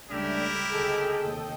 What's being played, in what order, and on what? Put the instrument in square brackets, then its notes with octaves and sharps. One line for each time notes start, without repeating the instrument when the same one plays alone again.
[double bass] C#2 G3 [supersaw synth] A3 [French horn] D4 [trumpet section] E4 G4 A#4
[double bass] D2 C#3 [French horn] G#4 [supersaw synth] A4 D#5 G5
[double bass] F1 D#2